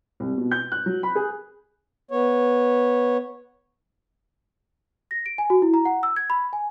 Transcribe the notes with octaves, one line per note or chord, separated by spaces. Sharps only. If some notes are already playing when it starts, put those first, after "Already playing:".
C2
B2
G6
F#6
F#3
B5
G#4
B3 C#5
A#6
D7
G#5
F#4
E4
A#5
F#5
E6
G#6
B5
G#5